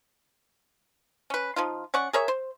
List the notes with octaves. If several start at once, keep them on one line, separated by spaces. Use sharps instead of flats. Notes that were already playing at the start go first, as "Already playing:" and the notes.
C#4 B4
F3 D#4 F4
C#4 D5 F#5 C#6
G#4 A#4 C#5 E5
C5